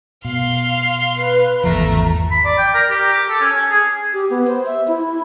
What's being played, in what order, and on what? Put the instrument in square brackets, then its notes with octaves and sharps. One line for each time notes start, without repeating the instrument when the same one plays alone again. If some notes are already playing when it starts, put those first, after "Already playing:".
[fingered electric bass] B2 [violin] F5 C6
[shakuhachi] B4
[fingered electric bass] G#1 E2 F3 [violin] A3 [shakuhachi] A#5
[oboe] B5
D5
G5
A#4
G4
D6
A4
C#4
G#5
G#4
[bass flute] G4
B3
C5
E5
E4